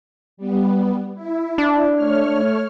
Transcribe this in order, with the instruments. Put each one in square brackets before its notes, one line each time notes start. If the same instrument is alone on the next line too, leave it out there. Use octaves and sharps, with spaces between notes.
[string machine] G3 B3
E4
[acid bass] D4
[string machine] A3 C#5 F6